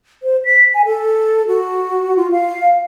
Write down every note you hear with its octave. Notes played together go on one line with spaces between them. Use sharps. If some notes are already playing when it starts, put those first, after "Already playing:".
C5
B6
G#5
A4
F#4
F4
F5